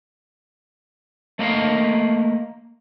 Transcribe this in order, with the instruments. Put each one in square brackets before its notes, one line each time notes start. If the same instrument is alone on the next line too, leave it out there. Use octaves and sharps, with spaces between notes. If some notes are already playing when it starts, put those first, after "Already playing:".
[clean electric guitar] A3 A#3 D#5 F5